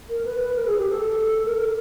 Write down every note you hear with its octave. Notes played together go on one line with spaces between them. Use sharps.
A#4
B4
B4
A#4
G#4
G4
A4
A#4
A#4